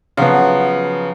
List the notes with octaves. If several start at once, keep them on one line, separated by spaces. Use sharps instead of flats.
C#3 F3 F#3 B3